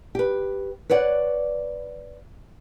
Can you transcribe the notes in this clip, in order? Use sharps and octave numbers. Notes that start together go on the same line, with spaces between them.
G4 B4
B4 C#5 D5 F#5